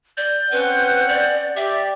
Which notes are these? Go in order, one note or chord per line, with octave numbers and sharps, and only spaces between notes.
D5 G6
C4 C#4 B4 F#5
D5
G4 D5 E5